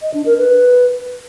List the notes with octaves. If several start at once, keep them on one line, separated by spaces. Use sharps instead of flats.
D#5
D4
A#4
B4